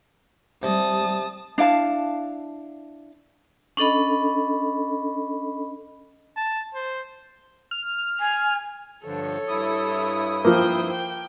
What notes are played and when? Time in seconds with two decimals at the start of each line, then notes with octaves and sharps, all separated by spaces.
0.63 C3 G3 A5 D#6
1.58 D4 E4 F5 A5
3.77 C#4 D4 A4 D#5 B5
6.37 A5
6.75 C5
7.71 F6
8.19 G#5
9.05 G2 D3 F3 A4 C#5
9.48 G2 E4 D#6
10.45 F3 A#3 C5 G5
10.91 G5